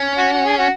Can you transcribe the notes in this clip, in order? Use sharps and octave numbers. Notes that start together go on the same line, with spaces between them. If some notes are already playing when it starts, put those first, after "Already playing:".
Already playing: C#4
F#4
F#4
G#4
F#4